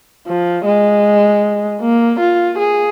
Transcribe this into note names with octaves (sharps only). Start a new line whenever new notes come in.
F3
G#3
A#3
F4
G#4